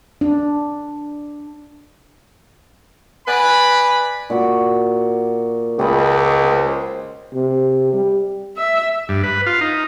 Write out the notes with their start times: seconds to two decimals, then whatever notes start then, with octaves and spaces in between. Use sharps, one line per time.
0.21 D4
3.27 B4 D5 G#5 B5
4.30 A#2 F#4 D6
5.79 C#2 G4 D#5 B5
6.44 C5 G5
7.34 C3
7.93 G3
8.57 E5
9.09 G2
9.24 B4
9.46 F4
9.61 D#4